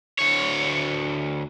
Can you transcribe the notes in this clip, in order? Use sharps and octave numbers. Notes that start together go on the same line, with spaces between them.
D2 C#5